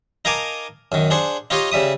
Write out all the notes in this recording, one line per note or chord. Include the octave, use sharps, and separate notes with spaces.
D#4 A#4 F5 G#5 A5 D6
F#2 D#3
D4 G#4 C5 F#5
D#4 F4 G4 C#5 D#5 F5
C#3 G3 E5 D#6